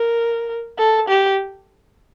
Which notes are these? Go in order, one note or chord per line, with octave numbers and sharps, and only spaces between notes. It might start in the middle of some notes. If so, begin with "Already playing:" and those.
Already playing: A#4
A4
G4